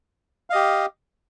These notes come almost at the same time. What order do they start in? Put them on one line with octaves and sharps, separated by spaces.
F5 D#5 G4